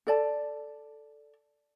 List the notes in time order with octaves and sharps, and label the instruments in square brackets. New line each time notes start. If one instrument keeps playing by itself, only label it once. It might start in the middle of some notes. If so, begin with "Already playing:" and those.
[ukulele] A4 D5 A5